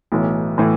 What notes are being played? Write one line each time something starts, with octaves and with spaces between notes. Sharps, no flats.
B1 A2 E3
A2 E3